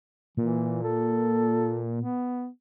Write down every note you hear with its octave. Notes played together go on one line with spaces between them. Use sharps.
A#2 E3
A4
B3